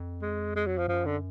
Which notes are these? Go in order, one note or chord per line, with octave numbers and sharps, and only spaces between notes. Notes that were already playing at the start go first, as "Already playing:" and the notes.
Already playing: F2
G#3
G#3
F#3
F3
F#2 F3
D3